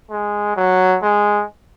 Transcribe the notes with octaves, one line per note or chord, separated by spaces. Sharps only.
G#3
F#3
G#3